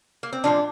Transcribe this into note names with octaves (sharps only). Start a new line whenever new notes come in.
A#3
C4
A#2 F3 G#3 D4